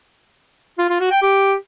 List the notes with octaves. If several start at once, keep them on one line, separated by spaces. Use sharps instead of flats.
F4
F4
F#4
G5
G4